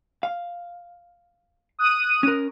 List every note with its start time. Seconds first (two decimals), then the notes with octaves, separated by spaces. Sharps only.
0.23 F5
1.79 D#6 F#6 D#7
2.23 C#4 A#4